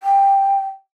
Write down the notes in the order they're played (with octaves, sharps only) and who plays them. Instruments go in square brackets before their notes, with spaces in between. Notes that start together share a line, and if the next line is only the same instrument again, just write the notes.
[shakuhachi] G5